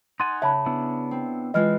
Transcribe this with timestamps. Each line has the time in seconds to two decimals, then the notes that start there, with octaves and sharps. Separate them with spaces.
0.20 D#4 F#5 G#5 C6 A6 D#7
0.42 C#3 E5 A5 B5
0.66 B3 D4 E4
1.11 C4
1.54 E3 G#3 F4 D#5 F6